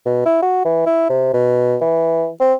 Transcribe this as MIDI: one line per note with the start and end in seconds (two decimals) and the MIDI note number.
0.06 0.26 47
0.26 0.38 64
0.42 0.64 66
0.65 0.82 52
0.86 1.07 64
1.09 1.31 48
1.34 1.76 47
1.81 2.29 52
2.40 2.54 60